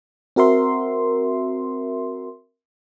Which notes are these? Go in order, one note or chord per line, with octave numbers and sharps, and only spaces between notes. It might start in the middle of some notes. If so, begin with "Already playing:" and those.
C4 F#4 A#4 E5 C6